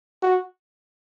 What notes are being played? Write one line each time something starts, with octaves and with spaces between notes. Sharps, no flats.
F#4